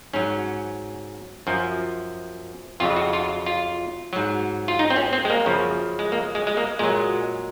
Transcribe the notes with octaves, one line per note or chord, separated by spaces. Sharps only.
G#2 F#3 C#4
F#2 F3
F2 C#3 F#3 F4
F#4
F4
F4
G#2 F#3
F4
D#4
C4
C#4
C4
G#3
A#3
F#2 C#3 F3
G#3
A#3
G#3
G#3
A#3
A#2 F#3 G#3